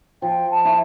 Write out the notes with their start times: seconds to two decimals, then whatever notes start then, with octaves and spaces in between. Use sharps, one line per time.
0.22 F3 G5
0.51 A5
0.65 E4